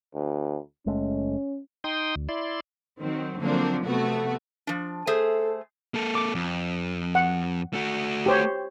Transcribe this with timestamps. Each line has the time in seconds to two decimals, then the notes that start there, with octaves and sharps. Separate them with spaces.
0.15 D2
0.86 F#1 G#3 A3 C#4
1.84 D#4 G5 C6 D#6
2.16 D2
2.29 E4 D5 C6
3.01 D#3 F#3 C4
3.39 D3 F3 F#3 A#3 C4 D4
3.85 C3 A3 B3 F#4
4.67 F3 D4
5.07 A3 G#4 A4 C5
5.94 A#3 A4
6.15 D6
6.35 F2
7.15 F#5
7.74 A3 F#4
8.26 G4 C5 C#5